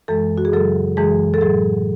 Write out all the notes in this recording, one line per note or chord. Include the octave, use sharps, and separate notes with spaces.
F#2 E3 G#3 A4
F#4
G#4
F#2 C#3 F#3 A4
F#2 E3 G#3 G#4
A4
A2 F#3 G#4